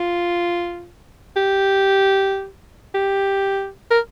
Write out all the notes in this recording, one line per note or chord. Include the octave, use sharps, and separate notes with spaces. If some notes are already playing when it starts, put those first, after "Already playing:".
Already playing: F4
G4
G4
A#4